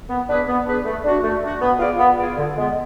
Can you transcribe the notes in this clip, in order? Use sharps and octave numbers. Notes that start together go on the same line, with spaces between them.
B3
D4 G#4 B4
B3
D4 G#4 B4
A3
D4 F#4
A3
D4 F#4
B3
F4 G#4 D5
B3
F4 G#4 D5
D3
G#3 B3